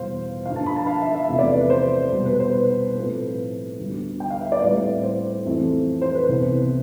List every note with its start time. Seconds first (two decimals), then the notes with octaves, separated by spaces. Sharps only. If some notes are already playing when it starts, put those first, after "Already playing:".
Already playing: E2 B2 G3 B3 C5 F5
0.46 G2 D3 F3 F5
0.56 A5
0.66 B5
0.76 A5
0.87 F5
1.02 E5
1.15 E5
1.29 E2 C3 F3 A3 E5
1.39 D5
1.50 B4
1.61 B4
1.70 C5
2.12 B2 G3 B3
2.25 B4
2.40 C5
2.53 B4
2.95 A2 F3 A3 C4 B4
3.79 D2 D3 G3 B3
4.20 G5
4.30 F5
4.41 E5
4.52 D5
4.62 A2 G3 C4 B4
5.03 C5
5.45 F2 E3 A3 C4
6.02 C5
6.15 B4
6.29 C2 C3 E3 B3